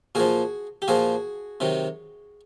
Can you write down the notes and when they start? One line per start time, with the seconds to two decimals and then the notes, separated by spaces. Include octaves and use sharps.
0.15 A#2 F3 F#4 G#4
0.82 G4
0.88 A#2 F3 F#4 G#4
1.60 C3 D#3 F#3